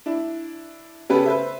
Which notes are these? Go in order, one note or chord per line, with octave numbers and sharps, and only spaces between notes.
D4 E4
C#3 B3 C#4 G4 A4 B4
B4 C5 E5